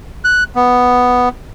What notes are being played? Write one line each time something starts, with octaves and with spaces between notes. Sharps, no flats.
F#6
B3